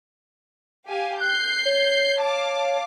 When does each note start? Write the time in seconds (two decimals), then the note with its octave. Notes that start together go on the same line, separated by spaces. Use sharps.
0.88 G4 F5 G#5
1.20 F#6 G6 C7
1.65 C#5
2.19 F5 A5 D6